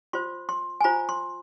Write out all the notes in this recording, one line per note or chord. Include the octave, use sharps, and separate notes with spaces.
F4 C5 C6
C6
G#5
F4 C5 A#5
C6